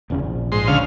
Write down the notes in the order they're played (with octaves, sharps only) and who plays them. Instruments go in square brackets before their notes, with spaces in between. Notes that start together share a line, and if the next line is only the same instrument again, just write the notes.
[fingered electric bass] E1 E2 C#3
A#1
[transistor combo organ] G#2 C6
D2 C#3 F5